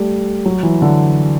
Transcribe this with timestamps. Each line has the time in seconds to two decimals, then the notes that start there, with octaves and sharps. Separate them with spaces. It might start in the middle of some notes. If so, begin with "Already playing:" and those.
Already playing: G3 A3
0.46 F#3
0.63 E3
0.82 D3